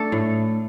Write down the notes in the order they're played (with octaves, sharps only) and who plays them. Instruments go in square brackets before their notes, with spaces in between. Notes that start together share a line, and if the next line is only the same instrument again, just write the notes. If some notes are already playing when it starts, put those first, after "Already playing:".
Already playing: [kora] A3 D4 A4
A2